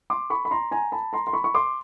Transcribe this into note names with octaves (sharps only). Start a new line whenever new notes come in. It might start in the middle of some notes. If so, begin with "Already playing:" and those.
C6 D6
B5 C#6
B5
A#5 C6
G#5 A#5
A5 B5
A#5 C6
C6
B5 C#6
C#6
C6 D6